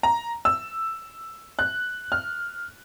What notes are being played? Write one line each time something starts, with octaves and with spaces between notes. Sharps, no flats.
A#5
E6
F#6
F6